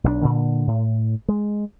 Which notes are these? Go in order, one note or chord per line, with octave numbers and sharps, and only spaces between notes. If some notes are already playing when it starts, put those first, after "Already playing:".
B1 G3 D4
A#2 D3
A2
G#3